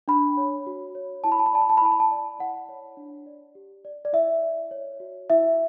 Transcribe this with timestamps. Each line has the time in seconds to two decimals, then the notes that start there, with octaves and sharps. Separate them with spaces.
0.08 D4 B5
0.37 C#5
0.67 F#4
0.95 C#5
1.24 E4 A5
1.32 B5
1.39 A5
1.46 B5
1.53 D5 A5
1.61 B5
1.69 A5
1.77 B5
1.82 E4 A5
1.92 B5
2.00 A5
2.11 D5
2.39 E4 F#5
2.69 C#5
2.97 D4
3.26 D5
3.55 G4
3.85 D5
4.05 D5
4.13 E4 E5
4.42 D5
4.71 C#5
5.00 F#4
5.30 E4 E5